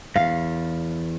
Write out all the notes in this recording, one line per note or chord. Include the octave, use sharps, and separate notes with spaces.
E2 G#2 F5